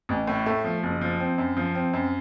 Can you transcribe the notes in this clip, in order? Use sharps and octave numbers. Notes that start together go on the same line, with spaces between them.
A1
A2
A3
F3
F#1
F3
C4
F#2
F3
C4
F#2